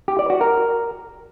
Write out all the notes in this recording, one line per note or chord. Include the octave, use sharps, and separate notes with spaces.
G4
D5
F#4
A#4